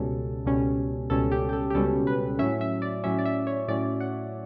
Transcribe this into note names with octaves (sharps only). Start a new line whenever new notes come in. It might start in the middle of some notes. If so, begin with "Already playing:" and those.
Already playing: C#2 B2 G3 C#4 A4
C#2 B2 G3 C#4
C#2 B2 G3 C#4 A4
G4
G4
A4
G4
C#2 B2 G3 C#4 A4
B4
A2 F#3 C#4 E5
E5
D5
A2 F#3 C#4 E5
D5
E5
C#5
A2 F#3 C#4 D5
F#5